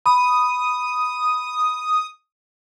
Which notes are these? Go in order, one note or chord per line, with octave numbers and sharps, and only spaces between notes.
B5 D#6